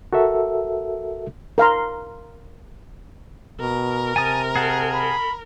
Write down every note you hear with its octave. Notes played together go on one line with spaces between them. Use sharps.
F#4 A4 A#4 E5
A#4 F5 A#5 C6
B2 A#4
C3 G#5 A5 D#6
G#4 F#5 A5
B5